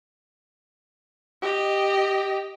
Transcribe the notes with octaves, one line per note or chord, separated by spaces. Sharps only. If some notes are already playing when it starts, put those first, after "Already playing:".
G4 D#5